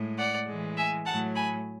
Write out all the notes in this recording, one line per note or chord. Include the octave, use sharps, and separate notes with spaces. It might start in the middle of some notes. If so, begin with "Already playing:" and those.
Already playing: A2 G#3
D5 F#5
A2 E3 G#3
E5 G#5
A2 F#3 A3 F#5 A5
G#5 B5